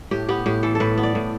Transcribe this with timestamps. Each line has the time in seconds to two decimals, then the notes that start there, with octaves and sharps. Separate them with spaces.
0.11 A2 G4
0.28 B3 G4
0.46 A2 G4
0.63 E3 A4
0.75 A4
0.80 A2 B4
0.97 B3
1.03 D5
1.15 A2